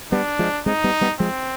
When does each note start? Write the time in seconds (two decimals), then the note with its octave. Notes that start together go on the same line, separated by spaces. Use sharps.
0.12 G3 B3 D4
0.39 F3 G#3
0.66 G#3 C4 D#4
0.84 G3 B3
1.01 G3 B3
1.19 F3 G#3 C4